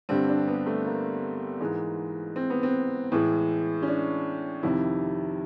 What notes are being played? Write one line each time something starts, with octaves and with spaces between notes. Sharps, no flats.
G2 D3 G3 C4
D4
B3
A3
A#3
G#2 E3 G#3
C4
B3
C4
A2 E3 G#3
C#4
D4
F2 C3 D#3 E4